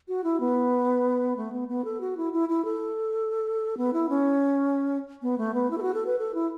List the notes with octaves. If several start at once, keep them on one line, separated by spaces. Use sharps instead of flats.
F#4
E4
B3
A3
B3
B3
A4
F#4
E4
E4
E4
A4
B3
E4
C#4
B3
A3
B3
E4
A4
F#4
A4
B4
A4
E4